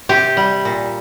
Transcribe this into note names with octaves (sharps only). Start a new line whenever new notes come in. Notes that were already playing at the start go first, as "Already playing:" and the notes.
C3 G4
G3
A#2